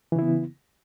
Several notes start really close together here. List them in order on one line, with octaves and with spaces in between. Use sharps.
E3 C#3 E4 B3